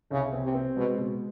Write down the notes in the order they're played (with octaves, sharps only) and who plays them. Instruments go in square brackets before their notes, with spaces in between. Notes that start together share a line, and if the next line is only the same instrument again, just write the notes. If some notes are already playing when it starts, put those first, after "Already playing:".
[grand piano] C2 [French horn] C#3
[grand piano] C4
[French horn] C3
[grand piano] C4
[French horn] B2 [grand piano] G#3
[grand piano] B2